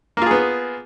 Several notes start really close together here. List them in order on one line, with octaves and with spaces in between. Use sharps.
A#3 F4 G#4 B3